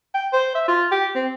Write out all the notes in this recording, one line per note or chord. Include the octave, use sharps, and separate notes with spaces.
G5
C5
E5
F4
G4
C4